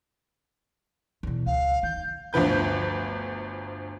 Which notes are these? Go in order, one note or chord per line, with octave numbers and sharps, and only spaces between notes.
E2 B2
C#2 F5
D#3 G6
G1 D2 F3 B4 G6